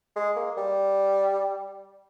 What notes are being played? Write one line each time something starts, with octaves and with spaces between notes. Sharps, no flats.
G#3
A#3
G3